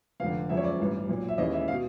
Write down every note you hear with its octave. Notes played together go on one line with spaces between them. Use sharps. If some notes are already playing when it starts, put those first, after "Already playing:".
F1 F2 D3 F5
F#1 F2 C#3 E5
C#5
D5
A1 G2 E3
B1 A#2
E5
D#2 C#3 E3 D#5
E5
F5
B2